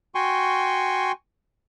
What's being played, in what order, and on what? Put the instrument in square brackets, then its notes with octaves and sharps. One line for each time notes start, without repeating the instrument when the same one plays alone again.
[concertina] F#4 G5 G#5 C6 C#6